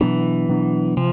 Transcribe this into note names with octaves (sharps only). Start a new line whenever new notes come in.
B2 E3 F#3 B3 D4
B2 F#3 B3 D4
C3 F3